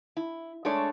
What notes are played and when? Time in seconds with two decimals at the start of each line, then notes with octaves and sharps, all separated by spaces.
0.17 E4
0.65 G#3 A3 D4 A4 C#5 D5